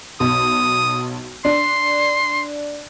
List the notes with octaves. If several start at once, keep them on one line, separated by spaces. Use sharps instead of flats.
B1 D#6
D4 C6